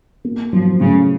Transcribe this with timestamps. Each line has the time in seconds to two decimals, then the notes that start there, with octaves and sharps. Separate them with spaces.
0.25 A#3
0.53 F3 F#3
0.80 A2 C#3